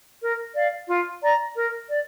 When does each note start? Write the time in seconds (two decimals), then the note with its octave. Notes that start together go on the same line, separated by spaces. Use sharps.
0.21 A#4
0.55 D5 F5
0.88 F4
1.22 D5 A#5
1.55 A#4
1.88 D5